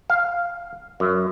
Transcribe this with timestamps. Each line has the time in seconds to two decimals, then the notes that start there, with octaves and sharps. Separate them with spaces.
0.10 F5
1.00 F#2